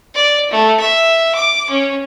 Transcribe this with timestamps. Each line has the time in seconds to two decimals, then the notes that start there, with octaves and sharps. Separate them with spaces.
0.15 D5
0.51 A3
0.80 E5
1.35 D6
1.70 C#4